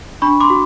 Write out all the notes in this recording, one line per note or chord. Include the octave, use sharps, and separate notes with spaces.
D4 B5 C#6
C6 D6
F#4